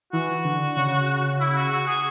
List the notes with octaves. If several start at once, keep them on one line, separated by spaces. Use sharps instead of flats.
E3 F#4
D3
C#3
E4
E4
F#4
F#4
G#4